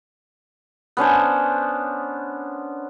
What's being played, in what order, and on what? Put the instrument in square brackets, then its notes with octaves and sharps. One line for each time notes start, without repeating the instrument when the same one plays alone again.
[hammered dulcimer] B3 C#4 D4 C5